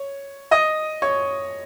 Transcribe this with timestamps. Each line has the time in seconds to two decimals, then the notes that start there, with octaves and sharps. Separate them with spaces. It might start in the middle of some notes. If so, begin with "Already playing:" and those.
Already playing: C#5
0.51 D#5 D#6
1.02 C#5 C#6